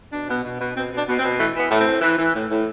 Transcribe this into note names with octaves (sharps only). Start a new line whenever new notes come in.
B2 D4
B2
B2
B2
B2 C4
B2 D4
B2
C4
B2
E3 A3
E3 B3
A2
C4
A2
E3
E3
A2
A2